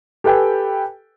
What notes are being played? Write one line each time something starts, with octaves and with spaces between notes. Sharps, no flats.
G4 A4 B4 G5 G#5